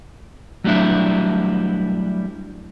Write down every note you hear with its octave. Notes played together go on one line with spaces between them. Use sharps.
F#3 G3 A3 D4 E4